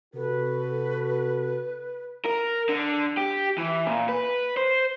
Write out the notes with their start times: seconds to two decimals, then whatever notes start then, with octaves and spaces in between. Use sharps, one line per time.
0.14 C3 F#4 A4 B4
2.25 A#4
2.69 D3
3.17 G4
3.58 E3
3.86 A#2
4.09 B4
4.57 C5